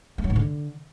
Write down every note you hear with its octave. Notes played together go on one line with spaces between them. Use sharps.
A3
F#3
G#2
D3